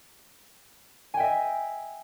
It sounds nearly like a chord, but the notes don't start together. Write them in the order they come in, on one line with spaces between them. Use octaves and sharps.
G#5 G5 E5 D#5